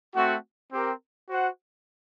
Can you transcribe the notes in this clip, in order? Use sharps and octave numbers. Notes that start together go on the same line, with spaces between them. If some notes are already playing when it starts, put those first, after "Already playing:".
A3 C4 F#4
C4 G4 A#4
F#4 C5 F#5